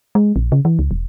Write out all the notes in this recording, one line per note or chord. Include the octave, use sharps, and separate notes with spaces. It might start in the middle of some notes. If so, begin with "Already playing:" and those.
G#3
A#1
C#3
E3
C#2
E1